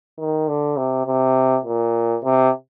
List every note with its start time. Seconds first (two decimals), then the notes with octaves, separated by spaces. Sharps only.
0.19 D#3
0.48 D3
0.77 C3
1.06 C3
1.65 A#2
2.24 C3